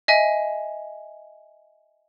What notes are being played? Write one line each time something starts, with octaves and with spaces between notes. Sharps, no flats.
D#5 E5 G#5